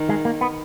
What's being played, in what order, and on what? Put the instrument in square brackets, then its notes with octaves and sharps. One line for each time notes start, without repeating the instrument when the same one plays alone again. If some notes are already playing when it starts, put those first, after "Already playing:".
Already playing: [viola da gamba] D#3
[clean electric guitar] G#3
A#3
B3